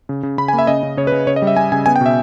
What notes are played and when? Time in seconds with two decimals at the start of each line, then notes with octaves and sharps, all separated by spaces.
0.09 C#3
0.23 C#3
0.38 C#3 B5
0.48 G#5
0.53 A#3
0.58 E5
0.67 C#3 D#5
0.83 C#3
0.97 C#3 C#5
1.07 B4
1.12 C#3
1.27 C#3 C#5
1.36 D#5
1.42 G3
1.47 E5
1.57 G3 G#5
1.72 C#3 G#5
1.86 B3 G#5
1.96 G5
2.01 B2 E5